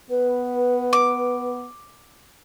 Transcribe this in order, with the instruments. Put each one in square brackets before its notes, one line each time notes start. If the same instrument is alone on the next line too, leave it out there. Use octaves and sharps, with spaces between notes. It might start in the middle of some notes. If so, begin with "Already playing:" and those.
[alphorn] B3 [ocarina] B4
[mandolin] D6